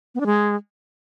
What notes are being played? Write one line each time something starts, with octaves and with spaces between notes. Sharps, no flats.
B3
D4
G#3